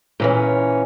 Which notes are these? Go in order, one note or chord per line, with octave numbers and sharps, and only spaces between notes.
A#2 E3 C#4